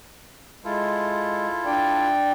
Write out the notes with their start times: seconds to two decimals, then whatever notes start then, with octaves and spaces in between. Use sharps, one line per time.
0.65 G#3 E4 F4 A4
1.65 D4 D5 G5